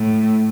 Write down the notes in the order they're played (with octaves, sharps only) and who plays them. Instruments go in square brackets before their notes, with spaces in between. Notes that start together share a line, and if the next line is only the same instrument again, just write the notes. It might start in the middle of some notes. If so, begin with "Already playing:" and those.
Already playing: [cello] A2